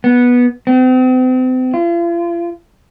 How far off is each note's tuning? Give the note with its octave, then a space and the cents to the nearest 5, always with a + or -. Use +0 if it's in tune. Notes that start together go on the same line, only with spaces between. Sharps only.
B3 -10
C4 -40
F4 -40